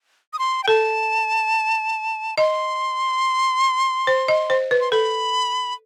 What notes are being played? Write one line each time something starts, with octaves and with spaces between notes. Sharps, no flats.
D#6
C6
G5
A4 A5
D#5 C6
C5
D#5
C5
B4
C6
A4 B5